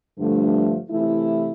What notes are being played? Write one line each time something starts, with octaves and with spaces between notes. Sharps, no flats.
G2 D3 F3 A3
C3 E3 A3 E4